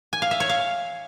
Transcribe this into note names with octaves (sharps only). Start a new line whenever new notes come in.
G#5
F5
E5
C#5
F5